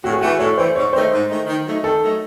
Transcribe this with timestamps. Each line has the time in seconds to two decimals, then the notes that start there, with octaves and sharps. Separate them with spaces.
0.04 A2 F#4
0.13 G#4
0.21 E3 A3 F#4
0.39 A2 C#5
0.57 E3 A3 C5
0.76 G#2 C#5
0.93 D#3 A3 D#4 C5
1.12 G#2
1.29 D#3 A3 D#4
1.47 D#3
1.65 F#3 A3 D#4
1.83 D#3 A4
2.02 F#3 A3 D#4